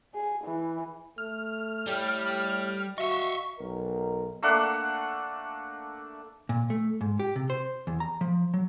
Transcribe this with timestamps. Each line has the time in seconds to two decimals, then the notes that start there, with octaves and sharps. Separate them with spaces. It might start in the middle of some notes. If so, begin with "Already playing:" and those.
0.14 G#4
0.44 E3
1.18 A3 F6
1.87 A2 G3 G4
2.98 F#4 D#5 E5 C#6
3.59 B1 A#4
4.43 A3 A#3 D4 F#5
6.49 A#2
6.70 A3
7.01 G#2
7.19 G4
7.36 C3
7.50 C5
7.87 E2
8.00 A#5
8.21 F3
8.54 F#3